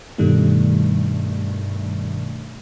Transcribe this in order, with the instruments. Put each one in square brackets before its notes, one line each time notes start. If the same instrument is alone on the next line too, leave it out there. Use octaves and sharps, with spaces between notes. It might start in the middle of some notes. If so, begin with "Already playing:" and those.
[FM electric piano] G2 B2 D#3 G3 A3